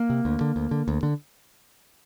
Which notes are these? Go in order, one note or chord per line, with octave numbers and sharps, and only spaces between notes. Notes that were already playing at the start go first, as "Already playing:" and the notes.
Already playing: A#3
C3
D2
D3
D2
D3
D2
D3